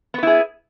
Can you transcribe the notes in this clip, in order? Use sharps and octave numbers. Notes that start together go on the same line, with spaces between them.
B3 E4 G#4 B4